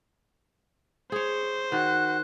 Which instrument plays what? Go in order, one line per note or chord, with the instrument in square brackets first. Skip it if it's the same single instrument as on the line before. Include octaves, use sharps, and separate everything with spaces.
[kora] G#4 C#5 [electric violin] C5
[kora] D#3 [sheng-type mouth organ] F#4 [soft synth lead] F#6